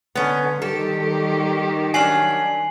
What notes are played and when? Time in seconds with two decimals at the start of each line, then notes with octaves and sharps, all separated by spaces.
0.15 D3 B3 C#4
0.62 D#3 G3 G4 A4
1.94 F#3 C#4 D4 G#5 C7 F#7